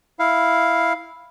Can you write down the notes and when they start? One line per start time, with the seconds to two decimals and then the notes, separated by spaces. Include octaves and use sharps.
0.19 E4 F5